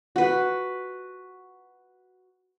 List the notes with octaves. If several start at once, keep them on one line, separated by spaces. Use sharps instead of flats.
F#4 B4